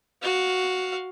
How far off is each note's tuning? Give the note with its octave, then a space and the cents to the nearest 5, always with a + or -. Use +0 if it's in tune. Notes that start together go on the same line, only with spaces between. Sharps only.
F#4 +0 F5 +10